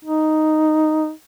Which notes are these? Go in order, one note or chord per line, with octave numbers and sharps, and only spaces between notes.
D#4